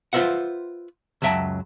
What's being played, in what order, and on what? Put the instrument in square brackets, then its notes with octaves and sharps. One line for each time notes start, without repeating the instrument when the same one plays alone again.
[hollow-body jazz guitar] F4 B4 C5 E5 F#5
C#2 F#2 F#3 E5 G5 A5